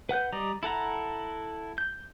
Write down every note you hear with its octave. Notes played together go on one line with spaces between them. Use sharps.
B4 F#5 F#6 G6
G3 D5 D#5 A#5
E4 A4 F#5 A#5
G6